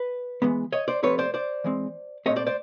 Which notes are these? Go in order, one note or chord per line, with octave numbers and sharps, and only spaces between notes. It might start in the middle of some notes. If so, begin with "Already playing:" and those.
Already playing: B4
E3 G#3 B3
C#5 D#5
C5 D5
C3 F3 A3 C4 B4 C#5
C5 D5
C5 D5
E3 G#3 C4
A#2 F#3 A3 C4 C#5 D#5
C5 D5
C5 D5